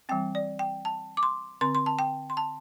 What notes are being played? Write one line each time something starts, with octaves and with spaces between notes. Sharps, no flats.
E3 G3 C4 G5
D5
G5
A5
D6
C6
D3 C4 C6
C6
A5
G5
C6
A5